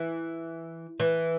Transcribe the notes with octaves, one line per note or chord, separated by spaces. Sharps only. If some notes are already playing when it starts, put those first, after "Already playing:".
Already playing: E3
E3